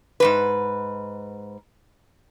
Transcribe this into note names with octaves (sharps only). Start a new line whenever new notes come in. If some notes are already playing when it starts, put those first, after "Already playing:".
G#2 C#3 B4